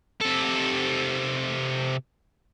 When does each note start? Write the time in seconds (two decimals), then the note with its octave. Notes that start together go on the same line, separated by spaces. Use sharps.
0.21 C3 A4